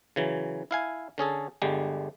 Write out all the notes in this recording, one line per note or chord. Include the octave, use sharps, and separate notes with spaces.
C#3 E3 F#3
E4 F5 G#5
D3 C#4 G#4 A4
G1 D3 G3 G#3